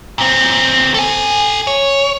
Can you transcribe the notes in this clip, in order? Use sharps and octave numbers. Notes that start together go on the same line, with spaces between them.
A#2 C4
A4 G#5
C#5